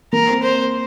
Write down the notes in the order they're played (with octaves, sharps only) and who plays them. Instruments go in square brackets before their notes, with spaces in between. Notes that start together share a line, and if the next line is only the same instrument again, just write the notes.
[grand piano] A#3 [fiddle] A#4
[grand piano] C4
[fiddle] C5